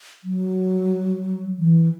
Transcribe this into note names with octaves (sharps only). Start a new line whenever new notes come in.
F#3
E3